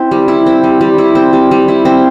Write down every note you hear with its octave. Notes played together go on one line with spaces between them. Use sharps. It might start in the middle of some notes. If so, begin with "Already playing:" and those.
Already playing: C4 E4
G3
E4
C4
G3
G3
E4
C4
G3
G3
E4
C4